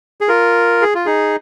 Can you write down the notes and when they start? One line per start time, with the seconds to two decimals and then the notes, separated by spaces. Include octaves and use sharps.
0.21 G#4
0.28 F4 A#4
0.82 G#4
0.95 F4
1.06 D#4 G#4